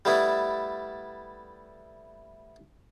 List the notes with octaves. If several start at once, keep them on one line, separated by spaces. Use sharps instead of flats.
G3 A3 B3 E4